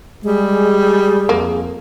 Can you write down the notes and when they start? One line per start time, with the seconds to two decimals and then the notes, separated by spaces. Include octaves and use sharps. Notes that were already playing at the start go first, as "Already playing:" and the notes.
0.24 G3 G#3 G#4
1.29 F2 A#3